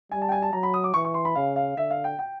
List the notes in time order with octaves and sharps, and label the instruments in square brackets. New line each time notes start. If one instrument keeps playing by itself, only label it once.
[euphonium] G3 [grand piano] G#5
[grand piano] A5
G5
G#5
A5
[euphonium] F#3 [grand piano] A#5
[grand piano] B5
D#6
D6
[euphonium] E3 [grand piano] C#6
[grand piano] C#6
C6
B5
[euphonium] C#3 [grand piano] F5
[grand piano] F5
[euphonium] D3 [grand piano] E5
[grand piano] F5
G5
G5